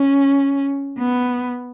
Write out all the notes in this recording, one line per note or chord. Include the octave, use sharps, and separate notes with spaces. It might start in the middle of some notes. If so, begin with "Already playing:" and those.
Already playing: C#4
B3